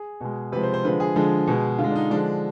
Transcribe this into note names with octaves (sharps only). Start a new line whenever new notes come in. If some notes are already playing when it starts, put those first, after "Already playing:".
Already playing: G#4
B2 G#3
C3 F3 G#3 B4
C5
C5
D3 F3 G#3 B4
G#4
D3 F3 G#3
B2 G#3
D3 F4
G#3
D4
D#4
D3 F3 G#3 D4